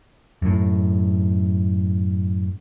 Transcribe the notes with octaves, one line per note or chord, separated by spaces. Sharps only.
F#2 A2